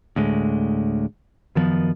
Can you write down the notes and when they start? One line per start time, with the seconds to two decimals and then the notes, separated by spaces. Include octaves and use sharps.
0.16 D2 A2 G#3
1.55 F#2 D#3 F3 B3